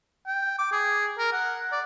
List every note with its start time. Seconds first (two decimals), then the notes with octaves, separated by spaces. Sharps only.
0.27 G5
0.58 D6
0.72 G#4
1.19 A#4
1.33 F#5
1.72 D5